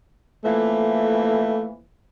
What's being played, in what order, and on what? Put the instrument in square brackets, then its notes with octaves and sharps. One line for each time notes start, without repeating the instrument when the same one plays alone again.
[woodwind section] F2 E3 A#3 [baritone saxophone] A3